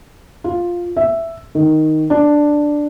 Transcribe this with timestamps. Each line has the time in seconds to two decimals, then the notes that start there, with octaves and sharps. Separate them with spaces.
0.44 F4
0.96 E5
1.55 D#3
2.10 D4